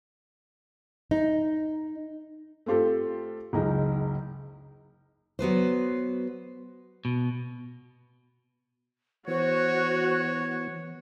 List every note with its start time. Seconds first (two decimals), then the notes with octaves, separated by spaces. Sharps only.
1.11 D#4
2.66 A3 C4 F4 G4 A4
3.53 F#1 C#2 G#3 D#4
5.39 F#3 B3 B4 C5
7.05 B2
9.27 E3 B3 F#4 C5 C#5